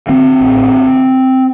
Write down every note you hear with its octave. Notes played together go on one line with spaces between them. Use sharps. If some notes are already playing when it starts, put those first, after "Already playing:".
D3 C4
A1